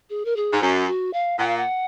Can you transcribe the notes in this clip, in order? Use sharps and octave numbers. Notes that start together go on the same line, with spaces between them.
G#4
A#4
G#4
G#2
F#2 F#4
F#4
F5
A#2 F#5
F5
F#5